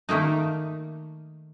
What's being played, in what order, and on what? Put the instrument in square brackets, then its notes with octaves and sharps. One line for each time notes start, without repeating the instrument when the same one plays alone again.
[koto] D#3 A3 A#3 D#4